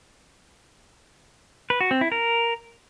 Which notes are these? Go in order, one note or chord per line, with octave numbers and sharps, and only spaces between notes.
B4
F#4
C4
E4
A#4